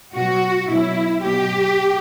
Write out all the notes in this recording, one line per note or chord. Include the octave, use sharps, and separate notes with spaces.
B2 F#3 F#4
B2 F#3 E4
B2 F#3 G4